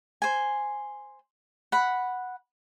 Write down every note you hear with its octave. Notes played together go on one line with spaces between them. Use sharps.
C5 G#5
F#5 B5